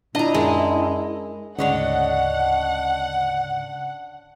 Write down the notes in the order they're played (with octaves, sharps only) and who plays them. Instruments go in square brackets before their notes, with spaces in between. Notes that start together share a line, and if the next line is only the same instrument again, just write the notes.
[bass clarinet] A#2 [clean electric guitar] D4 [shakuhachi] E4 [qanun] D#5 A#5
[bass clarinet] F#2 [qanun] G#3
[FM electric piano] D2 G#2 C#3 [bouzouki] D4 C#5 D#5 [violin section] F#5